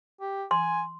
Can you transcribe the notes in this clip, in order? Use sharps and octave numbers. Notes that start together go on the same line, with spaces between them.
G4
G#5 C6